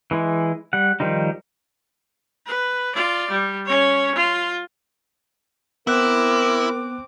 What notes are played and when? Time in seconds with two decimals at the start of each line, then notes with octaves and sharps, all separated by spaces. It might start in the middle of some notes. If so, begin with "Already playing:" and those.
0.11 E3 G#3 E4
0.73 G3 F#5
1.00 D#3 F3 G3 D#4
2.46 B4
2.95 F4 D5
3.31 G3
3.66 C#4 C#5
4.16 F4
5.87 B3 C4 E4 A#4 D6 F#6